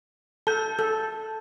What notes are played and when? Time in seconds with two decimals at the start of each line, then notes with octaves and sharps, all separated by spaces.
0.47 A4 A5 G6
0.79 A4